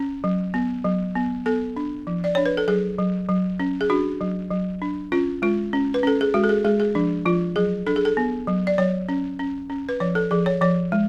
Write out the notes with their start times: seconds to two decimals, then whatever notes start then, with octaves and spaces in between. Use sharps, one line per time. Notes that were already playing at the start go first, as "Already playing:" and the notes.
Already playing: C#4
0.24 F#3
0.54 B3
0.85 F#3
1.15 B3
1.46 B3 A4
1.76 D4
2.07 F3
2.24 D5
2.35 D4 C#5
2.46 B4
2.57 A4
2.68 F#3 G#4
2.99 F#3
3.29 F#3
3.60 C#4
3.81 G#4
3.90 D4 F#4
4.21 F#3
4.51 F#3
4.82 D4
5.12 C#4 F4
5.42 G#3 F4
5.73 C#4
5.94 B4
6.03 C#4 A4
6.21 G#4
6.34 G#3 F#4
6.44 A4
6.49 G#4
6.64 G#3 G#4
6.80 G#4
6.95 F3 D4
7.25 F3 F4
7.56 F#3 G#4
7.87 D4 A4
7.96 G#4
8.05 A4
8.17 B3
8.47 F#3
8.67 D5
8.78 F#3 C#5
9.09 C#4
9.39 C#4
9.70 C#4
9.89 B4
10.00 F3 C#5
10.15 A4
10.31 F3 G#4
10.46 C#5
10.61 F3 C#5
10.92 G#3